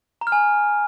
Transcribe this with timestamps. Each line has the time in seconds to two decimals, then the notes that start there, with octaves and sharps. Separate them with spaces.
0.21 A#5
0.27 F6
0.32 G#5